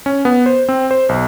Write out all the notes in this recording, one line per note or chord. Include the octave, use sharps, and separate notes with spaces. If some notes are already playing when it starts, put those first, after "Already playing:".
C#4
B3
C5
C4
C5
B1